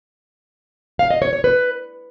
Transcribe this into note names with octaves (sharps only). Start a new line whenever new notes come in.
F5
D#5
C#5
C#5
B4